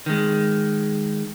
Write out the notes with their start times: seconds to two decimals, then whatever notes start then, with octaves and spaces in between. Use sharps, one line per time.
0.06 D#3 G#3